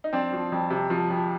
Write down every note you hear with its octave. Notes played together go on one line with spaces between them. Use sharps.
D#4
F2 C4 D4
F3
F2
C3
F3
F2